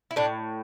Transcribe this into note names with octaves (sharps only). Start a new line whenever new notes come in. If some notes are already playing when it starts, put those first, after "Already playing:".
E4
A2 D4